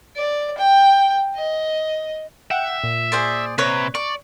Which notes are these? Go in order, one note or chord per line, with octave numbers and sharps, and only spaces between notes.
D5
G5
D#5
E5 F#5 G5
A#2
G#4 C5 D5
C3 B4 C#5
D5 C#6